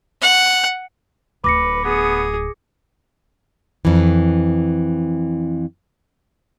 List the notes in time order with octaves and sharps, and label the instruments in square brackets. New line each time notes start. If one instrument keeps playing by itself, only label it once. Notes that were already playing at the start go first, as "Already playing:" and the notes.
[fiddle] F#5
[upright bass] D1 [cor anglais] B4 [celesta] D6 A#6 C#7
[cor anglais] B3 [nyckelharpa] G#4
[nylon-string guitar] F2 E3